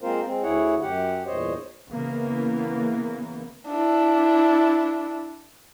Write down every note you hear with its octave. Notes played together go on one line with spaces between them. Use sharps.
G#3 A#3 C4 F4 A#4 C5
G#3 C4
D2 E4 G#4 C#5 F#5
F#2 G4 F#5
E2 G2 A#2 C5 C#5 D#5
C#3 E3 A#3 B3
D4 E4